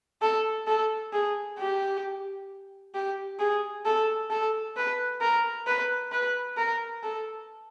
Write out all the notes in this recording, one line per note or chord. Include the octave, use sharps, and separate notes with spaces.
A4
A4
G#4
G4
G4
G#4
A4
A4
B4
A#4
B4
B4
A#4
A4